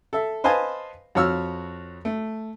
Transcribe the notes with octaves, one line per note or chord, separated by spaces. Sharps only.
A4 E5
B4 C5 D#5 F5 G#5 A5
F2 F#4 C#5 E6 F6
A3